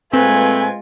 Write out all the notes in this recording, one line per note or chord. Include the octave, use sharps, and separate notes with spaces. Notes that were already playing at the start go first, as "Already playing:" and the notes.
A#2 G#3 A3 C4 F4 B4 G#5